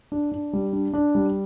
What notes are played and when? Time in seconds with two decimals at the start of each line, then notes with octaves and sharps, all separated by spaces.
0.12 D4
0.32 D4
0.53 G3
0.73 D4
0.94 D4
1.15 G3